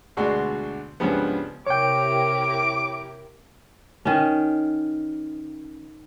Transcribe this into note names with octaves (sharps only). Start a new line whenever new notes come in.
D2 B2 G#3 D4 F#4 C6
C#2 G2 F3 B3
C3 E4 G4 A#4 C#5 G5 D6
D#3 C#4